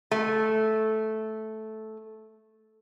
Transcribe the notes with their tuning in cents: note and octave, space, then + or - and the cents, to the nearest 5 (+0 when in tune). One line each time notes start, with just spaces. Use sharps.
A3 -10